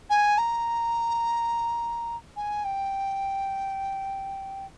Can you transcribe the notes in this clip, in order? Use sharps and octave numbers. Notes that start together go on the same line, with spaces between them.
G#5
A#5
G#5
G5